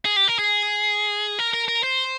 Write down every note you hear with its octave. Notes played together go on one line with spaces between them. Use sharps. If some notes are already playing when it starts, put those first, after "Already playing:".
G#4
G4
A#4
G#4
A#4
A#4
A#4
C5